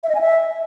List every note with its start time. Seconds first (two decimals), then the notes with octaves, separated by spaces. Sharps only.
0.04 E5
0.09 D#5
0.15 G#5
0.21 E5